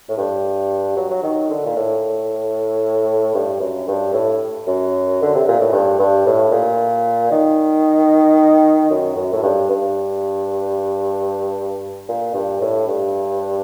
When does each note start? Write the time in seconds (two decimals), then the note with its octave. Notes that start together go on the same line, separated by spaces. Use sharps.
0.09 A2
0.17 G2
0.96 F#3
1.10 F#3
1.23 D#3
1.50 D3
1.66 A#2
1.76 A2
3.34 G2
3.60 F#2
3.88 G2
4.13 A2
4.67 F#2
5.23 D3
5.35 C3
5.48 A#2
5.60 A2
5.73 G2
5.99 G2
6.26 A2
6.52 A#2
7.31 D#3
8.90 F#2
9.16 F#2
9.33 A2
9.43 G2
9.70 G2
12.08 A#2
12.34 G2
12.61 A2
12.88 G2